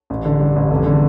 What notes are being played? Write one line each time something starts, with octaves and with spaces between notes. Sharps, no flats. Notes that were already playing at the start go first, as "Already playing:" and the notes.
A1
D3
G2
A1
F1
D3